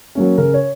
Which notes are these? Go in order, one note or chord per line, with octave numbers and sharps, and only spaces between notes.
F#3 A#3 C#4
C#3 A#4
C#5